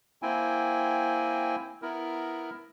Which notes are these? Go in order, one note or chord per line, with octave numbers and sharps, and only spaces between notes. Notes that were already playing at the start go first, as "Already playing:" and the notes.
A#3 C4 E4 G5 G#5
B3 E4 A#4